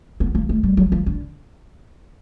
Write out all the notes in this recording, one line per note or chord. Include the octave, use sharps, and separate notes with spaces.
B3
A#3
A3
G3
F#3
F3
D3